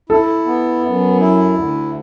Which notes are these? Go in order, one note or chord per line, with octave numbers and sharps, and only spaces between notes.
E4 A4
B3
F#2
E4
D2